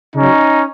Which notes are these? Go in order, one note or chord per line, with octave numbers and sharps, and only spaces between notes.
C#3 F#3 C#4 D#4